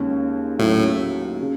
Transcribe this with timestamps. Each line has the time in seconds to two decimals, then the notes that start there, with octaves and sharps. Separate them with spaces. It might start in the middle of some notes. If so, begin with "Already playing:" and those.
Already playing: D#2 C#3 G#3 C#4
0.59 D#2 A2 C#3 F#3
1.42 C#3